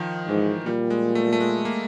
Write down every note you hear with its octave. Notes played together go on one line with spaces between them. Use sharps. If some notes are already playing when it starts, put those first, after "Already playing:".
Already playing: D#3 F3
G#2 E3
A#2 G3
G#3
A3
A3
G#3
A#3